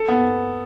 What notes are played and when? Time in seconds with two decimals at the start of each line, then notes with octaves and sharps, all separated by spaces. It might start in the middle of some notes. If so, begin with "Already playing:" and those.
Already playing: A4
0.08 B3